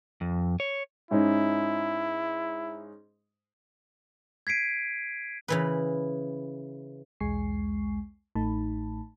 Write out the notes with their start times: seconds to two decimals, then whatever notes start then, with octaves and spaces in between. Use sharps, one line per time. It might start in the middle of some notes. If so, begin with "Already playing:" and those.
0.21 F2
0.60 C#5
1.11 G#2 C#4 D#4 E4
4.47 G#6 B6 C7 D7 D#7
5.48 C#3 E3 B4
7.20 B1 E2 G#3 G#5 C#6 C7
8.35 A1 A2 A3 D#4 A5 B5